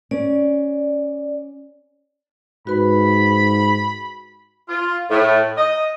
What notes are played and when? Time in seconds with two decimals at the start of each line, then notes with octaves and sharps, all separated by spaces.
0.11 C#4 D5
2.67 G#2 F#4 B4 B5
4.69 F4
5.11 A2
5.57 D#5